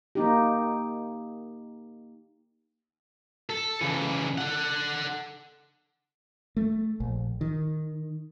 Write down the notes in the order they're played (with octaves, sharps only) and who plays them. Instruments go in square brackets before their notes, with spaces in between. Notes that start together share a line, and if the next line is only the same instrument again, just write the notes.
[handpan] A#3 D#4 G4
[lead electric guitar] A4
C#3 E3
A4 F#5
[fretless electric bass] A3
A#1
D#3